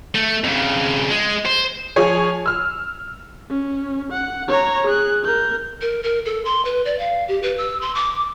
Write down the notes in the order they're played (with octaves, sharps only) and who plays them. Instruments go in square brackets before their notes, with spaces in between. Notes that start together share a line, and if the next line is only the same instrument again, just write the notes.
[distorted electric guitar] A3
F2 C#3
G#3
C5
[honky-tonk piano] F3 G#4 C#5 G#5
E6 F6
[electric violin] C#4
F#5
C#5 A#5
G#4 F#6
A#4 G6
[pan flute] A#4
A#4
A4
C6
B4
D5
F5
G4
B4
E6
C6
D6